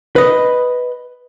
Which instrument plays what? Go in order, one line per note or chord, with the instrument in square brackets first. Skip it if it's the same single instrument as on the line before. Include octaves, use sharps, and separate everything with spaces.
[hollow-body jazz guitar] B4 D#5